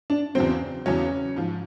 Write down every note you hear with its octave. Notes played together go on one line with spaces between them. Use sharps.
D4
E2 C#3 F#3 C4
E2 C#3 F#3 C#4
G#2 F3